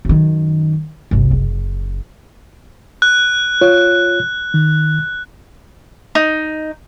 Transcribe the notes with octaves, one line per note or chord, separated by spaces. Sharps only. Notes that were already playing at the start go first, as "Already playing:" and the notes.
F#2 D#3
G1 C2
F#1
F#6
F4 C#5
D#3
D#4